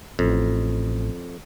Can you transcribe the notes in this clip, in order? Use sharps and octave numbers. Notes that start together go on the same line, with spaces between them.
A1 F2